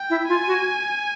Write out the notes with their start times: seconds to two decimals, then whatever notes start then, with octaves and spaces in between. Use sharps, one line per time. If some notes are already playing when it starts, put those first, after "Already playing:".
Already playing: G5
0.10 E4
0.28 F4 G#5
0.48 F#4